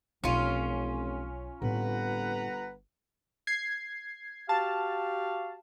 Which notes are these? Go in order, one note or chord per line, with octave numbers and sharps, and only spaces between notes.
F1 B1 F#3 C#4 F4
G1 A2 C4 B4 F#5 A#5
G#6 C7
F#4 G4 F5 A5